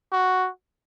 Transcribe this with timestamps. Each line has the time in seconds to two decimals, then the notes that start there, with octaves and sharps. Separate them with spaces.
0.12 F#4